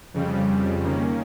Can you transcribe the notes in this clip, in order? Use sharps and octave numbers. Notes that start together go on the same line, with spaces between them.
F2 C#3 G3
D#3 A#3 C#4